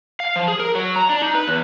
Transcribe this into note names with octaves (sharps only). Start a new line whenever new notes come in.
F5
F3
G#4
A#4
F#3
A#5
D4
D#4
B4
E2